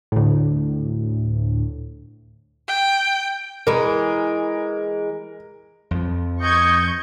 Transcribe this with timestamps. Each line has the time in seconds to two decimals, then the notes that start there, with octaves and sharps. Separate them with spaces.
0.12 D2 A2
2.68 G5
3.67 E3 G#3 A#4
5.91 F2 F3
6.41 D#5 C#6 G6 G#6